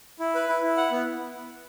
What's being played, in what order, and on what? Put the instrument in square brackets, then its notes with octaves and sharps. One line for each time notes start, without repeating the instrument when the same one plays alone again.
[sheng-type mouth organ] E4
B4
E4
E4
F#5
B3